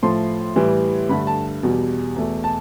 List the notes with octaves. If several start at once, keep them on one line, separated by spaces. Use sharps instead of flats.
A2 F3 A3 C6
A2 E3 G3
G2 D3 A3 B5
A5
E2 B2 G3
E2 B2 A3
A5